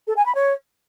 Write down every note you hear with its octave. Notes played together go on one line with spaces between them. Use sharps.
A4
G#5
B5
C#5